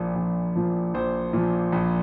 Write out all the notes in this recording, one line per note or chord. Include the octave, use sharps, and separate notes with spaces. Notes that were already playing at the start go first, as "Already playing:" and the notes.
Already playing: A#1 A#2 F3
A#1
A#2 F3
A#1 C5
A#2 F3
A#1